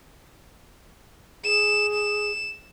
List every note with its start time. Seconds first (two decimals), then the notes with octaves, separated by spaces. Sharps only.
1.44 G#4 E7
1.93 E7